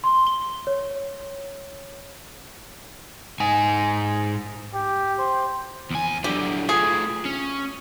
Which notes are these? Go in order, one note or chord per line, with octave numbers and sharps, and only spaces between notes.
C6
G7
C#5
G#2 D#4 G#5
G4
C5
E2 G#5
D3 F#3 G4
A3 F4 G#4
C#4